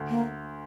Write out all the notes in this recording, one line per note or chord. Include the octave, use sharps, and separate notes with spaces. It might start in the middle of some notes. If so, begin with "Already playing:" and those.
Already playing: D2
A#3